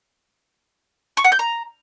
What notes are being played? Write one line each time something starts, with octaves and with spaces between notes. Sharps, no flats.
C#6
F#5
G6
A#5